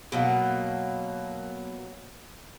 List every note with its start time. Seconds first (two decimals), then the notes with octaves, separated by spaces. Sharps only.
0.12 B2 F#3 A#3